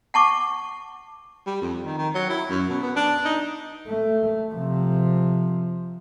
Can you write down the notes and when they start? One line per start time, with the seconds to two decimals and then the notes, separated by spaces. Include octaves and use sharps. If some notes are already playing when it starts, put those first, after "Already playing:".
0.14 F#5 A5 C#6 D6
1.47 G3
1.62 F2
1.85 D#3
1.98 D#3
2.14 F#3
2.29 E4
2.49 F#2
2.69 B2
2.82 B3
2.96 D4
3.25 D#4
3.88 A3
4.53 C3 F3